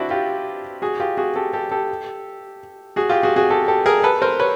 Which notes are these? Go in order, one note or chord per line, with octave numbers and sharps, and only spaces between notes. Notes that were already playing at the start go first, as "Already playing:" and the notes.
Already playing: C4 D4 E4 F#4
F4 G4
F#4 G#4
F4 G4
F#4 G#4
G4 A4
G4 A4
G4 A4
F#4 G#4
F4 G4
F#4 G#4
F#4 G#4
G4 A4
G4 A4
G#4 A#4
A4 B4
A#4 C5
B4 C#5